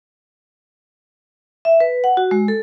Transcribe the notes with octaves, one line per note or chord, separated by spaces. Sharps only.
E5
B4
F#5
F#4
G#3
A4